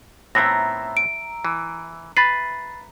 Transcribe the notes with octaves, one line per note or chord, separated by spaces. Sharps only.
A2 B3 C4 E5 A#5 A#6
D7
E3
B4 B5 A6 C7